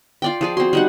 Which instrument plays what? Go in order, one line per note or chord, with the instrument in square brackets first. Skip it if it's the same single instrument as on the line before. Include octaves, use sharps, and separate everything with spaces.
[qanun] F4 D5 G5
F3 G#4 D5
[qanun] C4 C6 [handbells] F#4
[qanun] G3 D#4 F#5